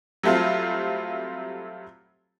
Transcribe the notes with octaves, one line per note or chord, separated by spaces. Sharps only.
F#3 G3 A3 C4 F4